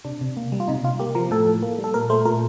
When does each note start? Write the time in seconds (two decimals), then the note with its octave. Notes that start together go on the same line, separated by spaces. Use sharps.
0.05 C3 D4
0.21 C3
0.37 A#3
0.52 G3
0.60 F4
0.68 C3 D#4
0.84 C3 F4
0.99 A#3 G4
1.15 F3 A#4
1.31 A2 A4
1.47 A2
1.62 A#3
1.78 G3
1.84 A4
1.94 A#2 A#4
2.10 A3 C5
2.25 A#2 A#4